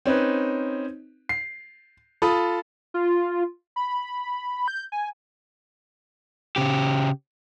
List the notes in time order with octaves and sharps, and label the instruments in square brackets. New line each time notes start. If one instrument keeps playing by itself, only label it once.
[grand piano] C4 C#4 D#4 B4
C7
F4 A4 B5 D#6
[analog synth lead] F4
B5
G6
G#5
[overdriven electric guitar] C#3 G4